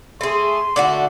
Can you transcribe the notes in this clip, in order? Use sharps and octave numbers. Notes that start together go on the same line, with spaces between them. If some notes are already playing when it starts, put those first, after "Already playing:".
A3 G#4 E5 C6
D3 A3 D#4 F#4 D5 D6